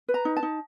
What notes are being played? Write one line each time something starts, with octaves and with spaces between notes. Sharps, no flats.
B4
A#5
D#4
A5
D#4